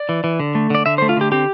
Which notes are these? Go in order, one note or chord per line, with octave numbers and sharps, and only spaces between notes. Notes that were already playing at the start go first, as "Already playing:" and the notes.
Already playing: D5
E3
E3
D3
A3
D3 D5
D3 E5
C5
A3
F4
D3 G4
C4 G4